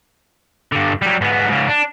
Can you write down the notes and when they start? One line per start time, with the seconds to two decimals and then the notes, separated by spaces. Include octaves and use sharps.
0.72 G2 D3
1.02 F#3 G3
1.21 G#2 B3
1.49 G#2 C#3
1.68 D4